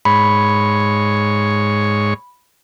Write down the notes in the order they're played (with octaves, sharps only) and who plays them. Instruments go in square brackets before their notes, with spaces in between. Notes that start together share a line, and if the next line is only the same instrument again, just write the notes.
[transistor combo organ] G#2 C#5 [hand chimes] B5